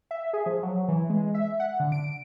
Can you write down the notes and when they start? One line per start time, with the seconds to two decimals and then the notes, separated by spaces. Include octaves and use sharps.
0.11 E5
0.33 G#4
0.46 F3
0.63 F#3
0.88 E3
1.10 G#3
1.34 E5
1.60 F#5
1.80 D3
1.92 D7